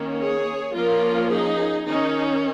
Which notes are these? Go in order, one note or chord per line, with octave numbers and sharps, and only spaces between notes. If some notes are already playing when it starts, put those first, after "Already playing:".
Already playing: D#3 A#3 C#4
G#4 C#5
F3 A#3 C#4 F4 A#4
D#4 G#4
D#3 C#4 D#4